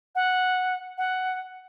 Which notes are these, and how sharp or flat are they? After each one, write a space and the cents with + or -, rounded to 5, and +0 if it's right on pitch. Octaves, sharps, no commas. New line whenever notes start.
F#5 -5
F#5 +5